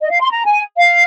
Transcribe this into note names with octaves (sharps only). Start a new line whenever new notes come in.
D#5
F5
C6
A#5
G#5
F5